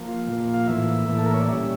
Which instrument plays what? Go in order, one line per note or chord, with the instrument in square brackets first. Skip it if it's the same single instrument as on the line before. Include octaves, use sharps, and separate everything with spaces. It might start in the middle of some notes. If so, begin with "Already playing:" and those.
Already playing: [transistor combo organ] F3 A#3
F4
A#2 F3 A#3
F5
A2 E3 A#3 E5
A2 E3 A#3
A4
A#4
C#5
D5
A#2 G3 C#4 E5